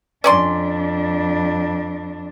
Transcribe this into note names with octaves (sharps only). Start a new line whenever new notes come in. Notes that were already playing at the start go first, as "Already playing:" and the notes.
F2 C#4 D4 D5 C6